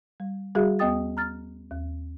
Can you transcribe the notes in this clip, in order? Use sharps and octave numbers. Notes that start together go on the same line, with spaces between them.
G3
G3 F#4 G#4 E5
D#2 B3 D#5 G5 D#6 A6
A#5 F6 A6
D#2